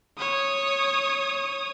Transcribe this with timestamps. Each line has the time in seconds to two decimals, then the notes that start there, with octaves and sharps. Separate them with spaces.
0.18 C#5 D#6